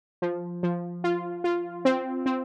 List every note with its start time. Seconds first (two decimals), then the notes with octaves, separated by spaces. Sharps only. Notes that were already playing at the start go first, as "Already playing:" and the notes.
0.22 F3
0.63 F3
1.04 F4
1.44 F4
1.85 C4
2.26 C4